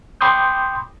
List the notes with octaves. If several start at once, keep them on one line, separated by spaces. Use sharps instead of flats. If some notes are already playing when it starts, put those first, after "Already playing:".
G5 B5 C6 D6 D#6 G6